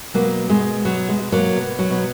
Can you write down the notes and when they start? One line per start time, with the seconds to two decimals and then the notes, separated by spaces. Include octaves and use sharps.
0.14 B2 F#3 A#3
0.49 B2 G#3
0.85 B2 F#3
1.09 G#3
1.21 B2
1.32 F#3 A#3
1.56 B2
1.79 F#3
1.90 B2